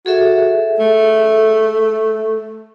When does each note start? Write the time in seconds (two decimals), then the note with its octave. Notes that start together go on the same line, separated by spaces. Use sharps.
0.06 F#4 G#4 A4 E5
0.80 A3